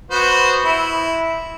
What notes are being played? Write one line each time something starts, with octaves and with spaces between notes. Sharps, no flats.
B3 F#4 C5
E4